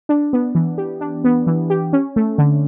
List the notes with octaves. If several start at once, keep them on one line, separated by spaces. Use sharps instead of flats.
D4
B3
E3
G4
D4
B3
E3
G4
C#4
A3
D3